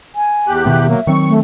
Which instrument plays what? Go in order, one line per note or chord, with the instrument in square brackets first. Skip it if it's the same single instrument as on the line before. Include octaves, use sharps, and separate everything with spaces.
[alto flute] G#5
[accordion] E2 G4 F#6
[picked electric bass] B2 D#3 B3 [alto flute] E5
[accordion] F#3 A#3
[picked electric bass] D#3 F#3 C4 [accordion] C#6
[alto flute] A3